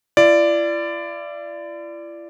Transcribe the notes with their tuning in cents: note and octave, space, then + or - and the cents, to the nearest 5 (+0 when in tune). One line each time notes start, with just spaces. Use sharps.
E4 +45 D5 +0